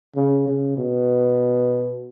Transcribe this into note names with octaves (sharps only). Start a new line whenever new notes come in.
C#3
C#3
B2